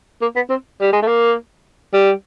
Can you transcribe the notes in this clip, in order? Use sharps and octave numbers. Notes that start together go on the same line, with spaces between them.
A#3
B3
C4
G3
G#3
A3
A#3
G3